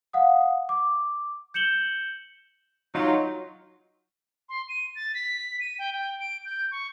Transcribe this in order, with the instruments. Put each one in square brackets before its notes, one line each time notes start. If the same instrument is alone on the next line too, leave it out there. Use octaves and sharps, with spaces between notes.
[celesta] F5 F#5 D#6
D6
G6 C#7 E7 F#7 G7
[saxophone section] F#3 [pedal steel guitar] D#4 F4
[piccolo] C6
D#7
A6
B6
D#7
G5
G5
D7
G6
C#6